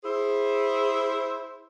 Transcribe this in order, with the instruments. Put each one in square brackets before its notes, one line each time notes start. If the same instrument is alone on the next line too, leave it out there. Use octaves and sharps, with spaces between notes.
[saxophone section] E4 G#4 C5